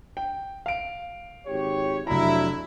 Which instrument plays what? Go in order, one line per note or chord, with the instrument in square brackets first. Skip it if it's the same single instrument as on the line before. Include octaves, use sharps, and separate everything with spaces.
[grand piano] G5
F5 D7
[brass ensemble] G#1 G4 C#5
[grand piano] F1 A#5 [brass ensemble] F#3 D4 E4